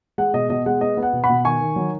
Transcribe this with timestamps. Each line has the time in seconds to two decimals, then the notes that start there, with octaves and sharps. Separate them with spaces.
0.18 G#3 F#5
0.34 B2 D#5
0.50 B2 D#5
0.66 G#3 F#5
0.81 B3 D#5
0.97 B3
1.03 F#5
1.13 B2
1.24 F#5 B5
1.29 B2
1.45 D#3 G#5 C#6
1.61 D#3
1.76 F#3